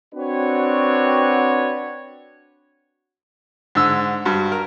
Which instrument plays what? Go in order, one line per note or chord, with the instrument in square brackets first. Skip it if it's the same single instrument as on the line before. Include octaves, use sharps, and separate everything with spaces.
[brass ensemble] C4 D4 F#4 B4 C#5
[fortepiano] G#2 D3 E6
G2 F#4
A#4